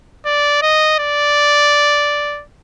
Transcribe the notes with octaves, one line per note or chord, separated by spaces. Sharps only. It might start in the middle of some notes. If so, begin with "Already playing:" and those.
D5
D#5
D5